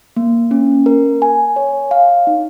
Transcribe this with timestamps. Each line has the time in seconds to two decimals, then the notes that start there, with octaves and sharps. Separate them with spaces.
0.17 A#3
0.51 C#4
0.86 A#4
1.22 G#5
1.56 C#5
1.91 F5
2.27 D#4